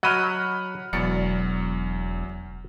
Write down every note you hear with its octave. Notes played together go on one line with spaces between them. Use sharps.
F#3 D#5 F#5 B5 F6
E1 E2 F#3 D5 C#7